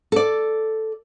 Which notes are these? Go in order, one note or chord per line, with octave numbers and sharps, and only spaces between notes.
A4 D5